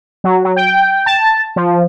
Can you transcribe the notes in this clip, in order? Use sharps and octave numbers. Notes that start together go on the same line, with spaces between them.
F#3
F#3
G5
A5
F3